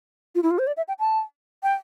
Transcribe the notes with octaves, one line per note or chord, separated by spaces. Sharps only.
F4
E4
F4
C5
D5
E5
G5
A5
G5